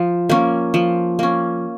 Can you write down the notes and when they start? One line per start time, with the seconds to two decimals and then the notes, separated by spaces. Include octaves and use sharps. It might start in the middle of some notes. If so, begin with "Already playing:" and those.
Already playing: F3
0.29 A#3 C#4
0.74 F3
1.19 A#3 C#4